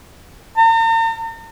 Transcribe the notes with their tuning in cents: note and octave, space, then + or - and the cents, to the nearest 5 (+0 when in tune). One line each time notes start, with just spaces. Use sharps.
A#5 -45